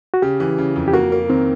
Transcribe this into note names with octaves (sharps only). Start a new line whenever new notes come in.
F#4
C#3 G4
E3
C#3
F2
G4
A#3 F#4
A#3
D#3 C4